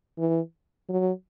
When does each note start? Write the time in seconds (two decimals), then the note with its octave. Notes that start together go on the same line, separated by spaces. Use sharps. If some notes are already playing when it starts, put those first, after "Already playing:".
0.18 E3
0.89 F#3